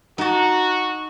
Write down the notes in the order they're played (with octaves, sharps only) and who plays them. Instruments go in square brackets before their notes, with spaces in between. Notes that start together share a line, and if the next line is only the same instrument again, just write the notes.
[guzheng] D#4 A5 [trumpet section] F#4